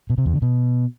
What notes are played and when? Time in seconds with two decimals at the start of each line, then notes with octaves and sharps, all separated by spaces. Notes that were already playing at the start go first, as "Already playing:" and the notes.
0.10 B2
0.18 C3
0.26 E2
0.34 D3
0.42 B2